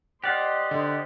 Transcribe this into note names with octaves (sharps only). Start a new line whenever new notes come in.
G4 C5 D5 D#5 F5 F#5
D3